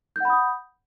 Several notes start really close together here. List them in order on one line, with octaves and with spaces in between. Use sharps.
G6 F#5 B5 D#6